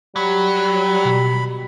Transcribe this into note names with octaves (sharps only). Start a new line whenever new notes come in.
F#3 G3 B5
B2